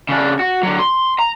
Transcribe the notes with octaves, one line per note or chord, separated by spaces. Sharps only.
C#3 D4
F#4
D3 F#3
C6
A#5